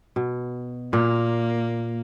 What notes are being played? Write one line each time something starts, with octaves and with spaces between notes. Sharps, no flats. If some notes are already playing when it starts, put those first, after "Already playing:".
B2
A#2 A#3